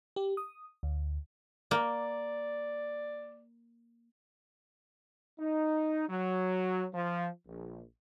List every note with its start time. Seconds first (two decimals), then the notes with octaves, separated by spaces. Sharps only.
0.16 G4
0.37 D#6
0.83 D2
1.71 A#3 D5
5.40 D#4
6.09 F#3
6.94 F3
7.47 A#1